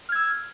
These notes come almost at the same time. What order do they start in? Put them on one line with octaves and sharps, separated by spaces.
F6 G#6 E6